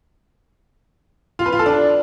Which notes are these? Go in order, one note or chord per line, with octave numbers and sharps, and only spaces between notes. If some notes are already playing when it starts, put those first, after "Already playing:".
F4
B4
F4
A4
D4